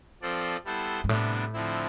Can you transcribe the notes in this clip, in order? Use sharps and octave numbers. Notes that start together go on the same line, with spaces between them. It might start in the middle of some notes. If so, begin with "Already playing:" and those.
F3 C4 F4 A4 D5
G3 B3 E4 A4 C5
G2
A2 C3 G3 B3 D4
D3 F3 C4 E4